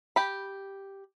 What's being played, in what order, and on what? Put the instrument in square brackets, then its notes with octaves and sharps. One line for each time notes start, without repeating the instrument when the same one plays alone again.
[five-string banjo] G4 B5